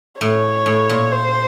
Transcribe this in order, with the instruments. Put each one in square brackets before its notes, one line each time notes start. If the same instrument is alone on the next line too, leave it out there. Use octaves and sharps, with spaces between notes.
[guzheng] A2 [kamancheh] C#5
[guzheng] A2
A#2
[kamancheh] C5